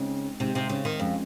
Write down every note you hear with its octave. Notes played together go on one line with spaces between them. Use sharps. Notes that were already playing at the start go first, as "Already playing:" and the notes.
Already playing: C#3 G#3 C4 D#4
C3 G#3 C4 D#4
C3
C#3
D#3
F2 F3 G#3 C#4